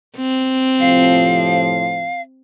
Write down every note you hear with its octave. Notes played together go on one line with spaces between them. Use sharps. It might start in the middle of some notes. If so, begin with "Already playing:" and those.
C4
A2 C3 F3 F5